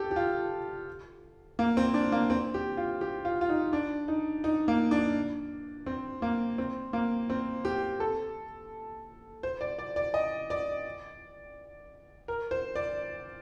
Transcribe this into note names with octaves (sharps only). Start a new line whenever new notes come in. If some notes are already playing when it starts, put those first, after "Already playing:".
Already playing: G4 A4
G4
F4
A#3
C4
D4
A#3
C4
G4
F4
G4
F4
F4
D#4
D4
D#4
D#4
A#3
D4
C4
A#3
C4
A#3
C4
G4
A4
C5
D5
D5
D5
D#5
D5
A#4
C5
D5